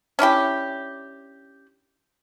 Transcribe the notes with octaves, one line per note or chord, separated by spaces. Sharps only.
C#4 D4 E4 G4